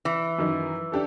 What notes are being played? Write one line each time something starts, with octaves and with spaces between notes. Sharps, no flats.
E3
F#2 D#3 D#4
D4 G4 A4